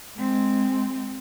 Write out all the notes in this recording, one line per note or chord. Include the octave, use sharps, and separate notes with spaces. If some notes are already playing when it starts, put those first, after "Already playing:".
G#3 C4